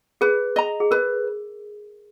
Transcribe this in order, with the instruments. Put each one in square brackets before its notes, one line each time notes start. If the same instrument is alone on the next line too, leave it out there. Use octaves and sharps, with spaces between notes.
[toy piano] G#4 [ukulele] B4
[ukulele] D#5 A#5
[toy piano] G#4
[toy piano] A#4 [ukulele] B4